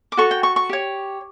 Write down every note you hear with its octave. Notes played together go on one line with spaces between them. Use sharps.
D6
F#4 A4 C#5 C#6
G5
C#6
C#6
G4 C#5